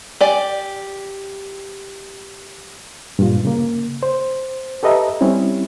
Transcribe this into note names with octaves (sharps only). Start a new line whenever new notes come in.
G4 D5 G#5
G2 A#2 F4
C#3 A#3
C5
G4 A4 B4 D#5 E5 A#5
G3 C4 C#4 E4